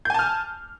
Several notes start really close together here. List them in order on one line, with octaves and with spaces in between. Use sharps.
G6 G#5 A5 F6